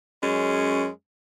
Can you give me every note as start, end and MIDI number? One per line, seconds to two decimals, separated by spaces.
0.22 0.88 42
0.22 0.88 56
0.22 0.88 61